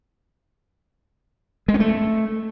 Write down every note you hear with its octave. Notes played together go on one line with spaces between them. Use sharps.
G#3
C#4
A3